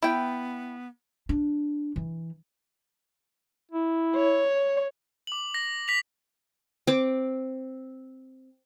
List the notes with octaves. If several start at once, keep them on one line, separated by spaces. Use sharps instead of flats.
B3 E4 G5
D4
E3
E4
C#5
D6 F#7
A#6
A#6 B6 F7
C4 D6